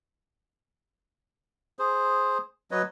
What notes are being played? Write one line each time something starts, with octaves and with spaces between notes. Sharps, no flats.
G#4 C5
F#3 B4 C#5 D#5